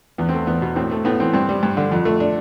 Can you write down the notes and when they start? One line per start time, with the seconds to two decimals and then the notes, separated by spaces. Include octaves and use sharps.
0.18 E2 B3
0.29 A3 C4
0.47 E2 B3
0.62 B2
0.76 A2 C4
0.91 A3
1.05 A2 B3
1.20 E3 C4
1.33 G2 C4
1.49 G3
1.63 G2
1.77 D3
1.92 F2
2.05 A3
2.20 D4